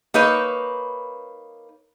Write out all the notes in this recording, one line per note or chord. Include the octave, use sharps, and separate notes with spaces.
A#3 D#4 B4 C#5